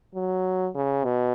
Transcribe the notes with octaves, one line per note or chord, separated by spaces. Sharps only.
F#3
C#3
B2